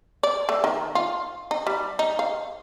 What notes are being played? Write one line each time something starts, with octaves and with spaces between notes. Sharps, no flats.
D5
A3
D#3
F4
D#4
G3
D#4
F5